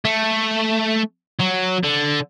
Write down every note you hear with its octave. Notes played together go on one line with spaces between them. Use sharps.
A3
F#3
D3